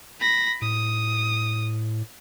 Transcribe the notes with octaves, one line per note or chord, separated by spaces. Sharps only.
B5 A#6
A2 D#6